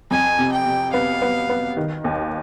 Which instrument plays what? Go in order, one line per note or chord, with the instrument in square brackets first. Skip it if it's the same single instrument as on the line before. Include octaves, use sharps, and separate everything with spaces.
[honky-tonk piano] F2 [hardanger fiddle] G#5
[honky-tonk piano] C3
[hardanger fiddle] G5
[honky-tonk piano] C3
[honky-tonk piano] B3 [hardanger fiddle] F5
[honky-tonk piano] B3
B3
D#3
D#2